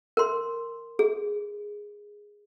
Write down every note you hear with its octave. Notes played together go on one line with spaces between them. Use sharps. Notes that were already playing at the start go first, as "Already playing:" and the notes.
A#4 C6
G#4